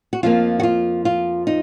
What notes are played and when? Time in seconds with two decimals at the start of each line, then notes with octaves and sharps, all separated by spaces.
0.13 F#4
0.23 F2 F3 A#3 F4
0.60 F#4
0.63 F4
1.05 F4
1.47 D#4